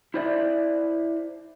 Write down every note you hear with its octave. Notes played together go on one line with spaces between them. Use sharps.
E4 C5 D5 E5